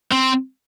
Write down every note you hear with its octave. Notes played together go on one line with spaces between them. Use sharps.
C4